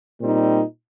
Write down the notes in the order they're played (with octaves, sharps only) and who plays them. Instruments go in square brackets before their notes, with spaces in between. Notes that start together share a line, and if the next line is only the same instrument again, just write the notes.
[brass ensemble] A#2 G3 C4 D#4